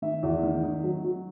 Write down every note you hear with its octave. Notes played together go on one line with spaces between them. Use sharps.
D#3 E5
E2
D#3
D#3
F#3
F#3